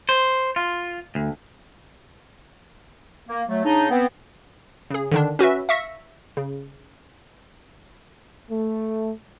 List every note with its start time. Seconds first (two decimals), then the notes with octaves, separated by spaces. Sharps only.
0.09 C5
0.56 F4
1.15 D2
3.29 A#3
3.48 F#3 A3
3.64 C#3 D4 D#4
3.90 B3 C4
4.90 C#3 G#4
5.12 D3 D#3 D4
5.39 C#4 F#4 B4 E5
5.69 E5 F5 C#6 A#6 B6
6.37 C#3
8.50 A3